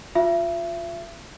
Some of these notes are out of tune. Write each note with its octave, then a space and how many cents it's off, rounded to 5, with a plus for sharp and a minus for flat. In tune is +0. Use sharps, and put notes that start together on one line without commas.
F4 +15 E5 +35